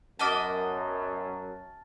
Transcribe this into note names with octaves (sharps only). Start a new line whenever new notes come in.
F#2 B3 D#5 A5 D6 F6 A6